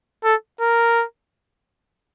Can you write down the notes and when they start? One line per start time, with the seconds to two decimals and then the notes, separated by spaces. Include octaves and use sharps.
0.24 A4
0.61 A#4